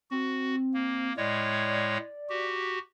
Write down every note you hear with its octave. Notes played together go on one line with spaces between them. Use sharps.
C4 F#4
A#3
A2 G#3 C#5 D5
F#4 G4